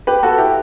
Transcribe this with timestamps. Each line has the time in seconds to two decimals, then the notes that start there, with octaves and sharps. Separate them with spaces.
0.07 G4 B4
0.23 F#4 A4
0.38 E4 G4